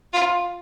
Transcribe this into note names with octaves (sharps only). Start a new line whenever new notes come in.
F4